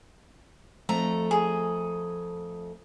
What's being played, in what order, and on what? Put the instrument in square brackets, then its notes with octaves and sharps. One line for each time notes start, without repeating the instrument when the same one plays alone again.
[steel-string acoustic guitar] F2 A3 A#5
[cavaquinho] G#4